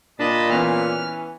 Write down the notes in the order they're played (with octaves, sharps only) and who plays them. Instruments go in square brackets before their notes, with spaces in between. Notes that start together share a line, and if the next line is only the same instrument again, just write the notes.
[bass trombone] A#2 [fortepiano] D4 [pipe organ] D#5 A5 B5
[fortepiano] E3 B3 C#4 [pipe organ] F6